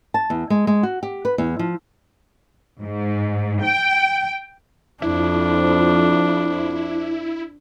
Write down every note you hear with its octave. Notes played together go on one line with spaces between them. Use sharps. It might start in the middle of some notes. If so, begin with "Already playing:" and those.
A5
E2
G#3
G#3
F#4
G4
B4
E2
F3
G#2
G5
F2 F3 D4 E4